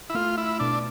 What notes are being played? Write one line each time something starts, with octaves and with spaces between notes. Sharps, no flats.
E4
A3 F4
E4
B2 D4